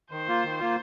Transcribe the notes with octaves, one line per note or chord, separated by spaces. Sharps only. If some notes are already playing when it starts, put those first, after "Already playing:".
D#3 C5
A#3 F4
D#3
A#3 F4